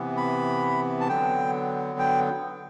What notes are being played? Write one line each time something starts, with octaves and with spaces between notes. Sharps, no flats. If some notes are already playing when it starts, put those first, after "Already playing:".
Already playing: C3 E3 B3
B5
A5
D3 F#3 B3 G5
G5